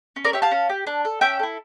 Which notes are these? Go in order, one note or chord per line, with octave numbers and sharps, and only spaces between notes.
C#4
A#4 D5
G4 C#5 E5
F5 A5
C#4
G4
D4
A4
C#4 E5 G5
E4 A4